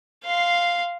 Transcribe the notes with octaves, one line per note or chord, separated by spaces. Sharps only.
F5 C6